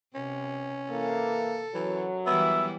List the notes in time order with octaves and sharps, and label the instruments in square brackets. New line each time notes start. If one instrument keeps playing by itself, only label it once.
[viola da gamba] C3 [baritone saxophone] C#4
[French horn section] E3 A#3 [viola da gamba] A4
[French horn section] F#2 F#3 [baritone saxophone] E3
[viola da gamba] E3 G3 E4 [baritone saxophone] B3 [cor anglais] E5